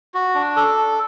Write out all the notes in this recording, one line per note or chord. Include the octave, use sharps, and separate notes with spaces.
F#4
D4
A4